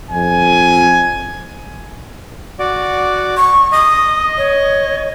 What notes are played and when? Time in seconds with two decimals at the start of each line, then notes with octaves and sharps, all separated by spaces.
0.11 F2 G#5
2.59 F#4 D5
3.37 C#6
3.72 D#5 D#6
4.38 C#5